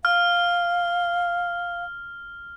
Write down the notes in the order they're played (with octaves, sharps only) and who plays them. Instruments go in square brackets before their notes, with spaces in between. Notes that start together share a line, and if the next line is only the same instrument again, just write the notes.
[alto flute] F5 [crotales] F6